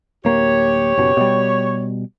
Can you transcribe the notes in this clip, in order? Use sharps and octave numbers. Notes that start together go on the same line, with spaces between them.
D1 A#3 G4 C#5
F#1 B2
B2 G3